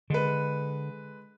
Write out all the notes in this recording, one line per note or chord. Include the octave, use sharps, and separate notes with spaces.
D3 G#3 B4